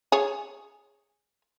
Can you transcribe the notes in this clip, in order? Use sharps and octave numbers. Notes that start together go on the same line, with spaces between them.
G#4 C#5